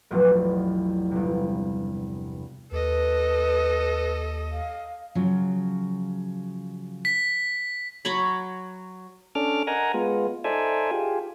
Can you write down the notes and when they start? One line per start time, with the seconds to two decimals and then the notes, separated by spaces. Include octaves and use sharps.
0.11 E1 A1 E2 F3 F#3
1.11 G1 C3
2.72 D#2 A4 B4 D#5
4.52 F5
5.15 C#3 F3 F#3
7.05 B6
8.05 F#3 C#5 B5
9.35 C#4 D4 A4 D6 F6
9.67 A#4 D#5 F#5 G#5 A#5
9.94 G#3 B3 F4
10.44 D#4 A4 C5 D5 E5 G#5
10.91 F4 G4 G#4